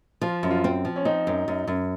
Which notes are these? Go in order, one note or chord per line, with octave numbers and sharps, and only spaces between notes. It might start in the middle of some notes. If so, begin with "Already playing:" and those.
F3 F4
F#2
F4
C4
F3
C#4
C4 D#4
F#2
F#2
F#2